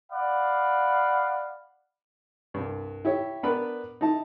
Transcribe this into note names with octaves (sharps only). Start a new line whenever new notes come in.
D5 F5 F#5 B5
C2 G2
E4 G4 C#5 E5
B3 D4 A#4 B4 B5
D#4 E4 A5